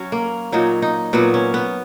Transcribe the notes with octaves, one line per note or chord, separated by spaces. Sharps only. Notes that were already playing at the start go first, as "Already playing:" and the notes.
Already playing: F#3 C#4
A#3
A#2 F#3 D#4
D#4
A#2 F#3 B3
C#4
B3